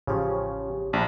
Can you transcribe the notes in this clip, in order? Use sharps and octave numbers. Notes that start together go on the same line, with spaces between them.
A1 C#3 F3 G4 C#5
A#1 D4 A5 B5